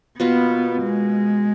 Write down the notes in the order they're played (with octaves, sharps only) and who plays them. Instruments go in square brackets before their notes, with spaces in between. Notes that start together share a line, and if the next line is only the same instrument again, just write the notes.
[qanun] B2 A#3 F4 B4 [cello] B3
[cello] G#3